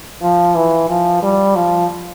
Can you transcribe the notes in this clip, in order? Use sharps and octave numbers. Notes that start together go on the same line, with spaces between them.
F3
E3
F3
G3
F3